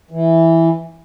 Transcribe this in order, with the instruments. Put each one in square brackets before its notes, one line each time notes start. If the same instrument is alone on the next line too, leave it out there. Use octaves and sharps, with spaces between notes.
[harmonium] E3